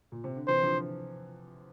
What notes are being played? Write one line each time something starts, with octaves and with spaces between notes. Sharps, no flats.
A#2
C3
D3
C3 E3 C5
D3 F3